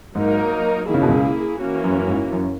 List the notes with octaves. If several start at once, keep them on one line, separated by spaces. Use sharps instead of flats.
G#2 F#3 A#3 D#4 A#4
D#3 A#3 E4 G#4
C#3
B2
C#2 C#3
E3 A#3 C#4 F#4
F#2
F#2
G#2
F#2